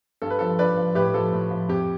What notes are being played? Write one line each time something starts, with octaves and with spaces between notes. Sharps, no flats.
G2 A4
B4
F3 A4
G2 B4 D5
F3
A2 G4 B4
F3 A4
A2
F3
F2 G4